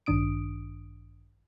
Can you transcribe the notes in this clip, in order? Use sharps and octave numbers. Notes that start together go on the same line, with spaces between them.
A1 G2 D#3 D4 D#6 D7